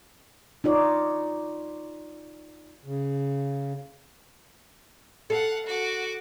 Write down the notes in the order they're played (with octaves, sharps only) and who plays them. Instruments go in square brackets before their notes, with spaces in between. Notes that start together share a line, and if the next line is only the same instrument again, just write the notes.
[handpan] D#4 F4 C#5 D5
[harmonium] C#3
[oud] A4 [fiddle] F5 F#5
[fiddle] F#4 D6